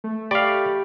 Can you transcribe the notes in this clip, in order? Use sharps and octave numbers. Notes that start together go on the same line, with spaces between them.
A3
G4 D5 F5 B5 C#6